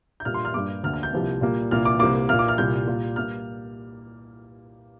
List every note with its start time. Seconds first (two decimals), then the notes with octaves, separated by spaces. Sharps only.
0.20 G6
0.25 A#2 G3 A#3 F6
0.34 C6
0.45 F6
0.54 G2 G3 A#3 D6
0.83 D2 D3 A#3 F6
0.93 F6
1.03 G6
1.12 C2 C3 F3 A#3
1.41 A#2 G3 A#3
1.71 C2 A#2 A#3 F6
1.85 D6
1.99 C2 C3 A#3 D6
2.29 A#2 A#3 F6
2.39 D6
2.48 F6
2.58 C2 A#2 G3 A#3 G6
2.87 A#2 G3 A#3
3.16 G3 A#3 F6